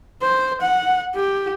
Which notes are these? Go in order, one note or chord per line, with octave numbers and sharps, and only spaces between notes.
C5
F#5
G4